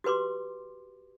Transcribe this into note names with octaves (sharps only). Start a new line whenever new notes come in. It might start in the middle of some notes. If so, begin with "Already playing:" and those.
F#4 G4 B4 C6 D6